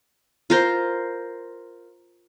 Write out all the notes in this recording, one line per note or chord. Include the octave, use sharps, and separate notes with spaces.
F4 A#4 C5